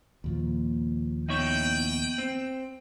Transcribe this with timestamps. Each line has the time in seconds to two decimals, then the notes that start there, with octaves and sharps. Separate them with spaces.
0.24 D#2 A#2 F3
1.29 B3 D#4 E4 C#5 G5
2.18 C4